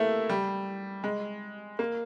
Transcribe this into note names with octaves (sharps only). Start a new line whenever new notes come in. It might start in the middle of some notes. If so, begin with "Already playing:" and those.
Already playing: A3 A#3 E4
G3
G#3
A#3